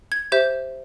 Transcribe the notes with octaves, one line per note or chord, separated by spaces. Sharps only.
G#6
G4 C5 E5 G6